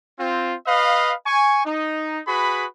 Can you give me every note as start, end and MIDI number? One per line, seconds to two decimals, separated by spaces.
0.19 0.54 60
0.19 0.54 65
0.66 1.13 71
0.66 1.13 75
0.66 1.13 77
1.26 1.61 80
1.26 1.61 85
1.65 2.20 63
2.27 2.65 66
2.27 2.65 68
2.27 2.65 71
2.27 2.65 83